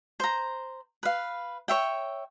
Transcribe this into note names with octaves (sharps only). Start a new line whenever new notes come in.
C5 A#5
B4 F5
C#5 E5 G5